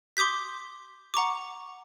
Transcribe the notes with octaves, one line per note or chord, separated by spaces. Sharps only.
C6 D6 D#6 G6 B6
F#5 A#5 C#6 D6